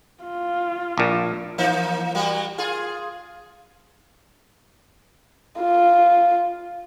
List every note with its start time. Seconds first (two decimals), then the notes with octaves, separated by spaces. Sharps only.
0.23 F4
0.98 A#1 A#2
1.58 E3 A#3 D#4
2.15 G3 A#3 F#4
2.58 F4 G#4
5.60 F4